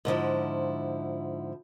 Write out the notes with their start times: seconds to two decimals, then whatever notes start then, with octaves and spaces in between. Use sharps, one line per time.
0.05 G#2 D3 F3 E4